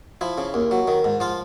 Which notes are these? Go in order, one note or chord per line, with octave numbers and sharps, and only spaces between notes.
F3 E4
C#3
D#2
F#3
D#3
G#2
F3 F4